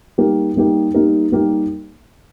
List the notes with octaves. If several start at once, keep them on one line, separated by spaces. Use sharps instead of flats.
G3 A#3 D#4 G4 A#4
G3 A#3 D#4 G4 A#4
G3 A#3 D#4 G4 A#4
G3 A#3 D#4 G4 A#4